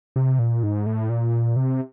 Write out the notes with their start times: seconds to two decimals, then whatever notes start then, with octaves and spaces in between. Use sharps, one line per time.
0.16 C3
0.39 A#2
0.63 G#2
0.86 A2
1.10 A#2
1.56 C3